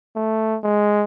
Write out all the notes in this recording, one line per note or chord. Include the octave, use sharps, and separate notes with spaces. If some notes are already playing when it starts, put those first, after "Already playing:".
A3
G#3